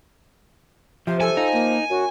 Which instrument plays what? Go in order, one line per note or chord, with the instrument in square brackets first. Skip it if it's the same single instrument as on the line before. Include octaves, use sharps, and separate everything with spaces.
[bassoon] C3 [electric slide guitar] F3 [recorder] C5
[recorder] A4 [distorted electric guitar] G#5
[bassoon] F3 [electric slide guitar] D#4
[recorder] A#3
[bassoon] F#2 [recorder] F#4